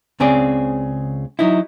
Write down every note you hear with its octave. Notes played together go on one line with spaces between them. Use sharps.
C#2 C#3 C4 G#4 D5
F#3 D#4 E4